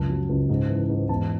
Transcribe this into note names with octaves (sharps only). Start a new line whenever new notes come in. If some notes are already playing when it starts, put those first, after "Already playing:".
Already playing: C#2 F#2 A5
F#3
C#2
G#2
E3
G#2
E2 A5